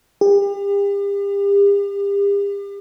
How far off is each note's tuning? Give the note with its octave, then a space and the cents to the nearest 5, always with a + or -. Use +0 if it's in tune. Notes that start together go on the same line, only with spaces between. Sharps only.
G4 +40